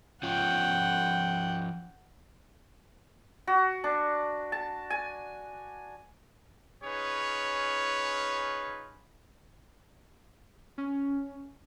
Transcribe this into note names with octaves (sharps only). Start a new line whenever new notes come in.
F3 C#4 F4 F#5 G5
F#4
D4
A5
G#5
C#4 D#4 F4 G#4 B4 C#5
C#4